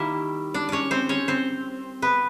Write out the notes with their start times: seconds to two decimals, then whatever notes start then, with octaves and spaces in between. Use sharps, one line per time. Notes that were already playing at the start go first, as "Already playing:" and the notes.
Already playing: D#3 G3 A#3 E4 E5
0.54 D4 D5
0.69 C#4 C#5 D5
0.91 C4 C5
1.09 C#4 C#5
1.28 C4 C5
2.02 B3 B4